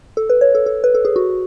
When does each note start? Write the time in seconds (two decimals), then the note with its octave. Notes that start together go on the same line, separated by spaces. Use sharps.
0.17 A4
0.30 B4
0.41 C#5
0.55 A4
0.66 A4
0.84 B4
0.95 A4
1.05 G#4
1.16 F#4